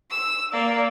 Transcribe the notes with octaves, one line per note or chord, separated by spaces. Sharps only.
E6
A#3 D5